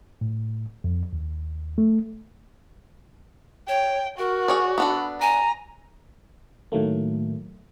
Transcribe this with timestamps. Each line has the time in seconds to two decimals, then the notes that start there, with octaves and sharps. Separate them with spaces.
0.21 A2
0.84 F2
1.13 D#2
1.78 A3
3.68 C#5 G5
4.19 F#4 A#4
4.48 G#4 C#5 D5
4.78 B3 D4 A4 B5
5.21 G#5 A#5
6.72 A2 D#3 F#3 A3 A#3